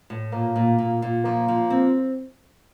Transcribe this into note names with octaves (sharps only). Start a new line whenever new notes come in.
A2
A#2 A#3
A#2
A#2
A#2
F3 A#3
F3
C4